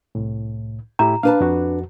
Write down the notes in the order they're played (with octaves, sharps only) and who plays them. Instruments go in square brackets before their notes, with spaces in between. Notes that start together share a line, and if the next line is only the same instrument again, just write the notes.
[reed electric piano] C2 A2
[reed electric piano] A2 E4 G4 [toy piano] A#5
[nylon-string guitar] D4 B4 A5 [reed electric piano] F5
[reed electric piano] F2 F#4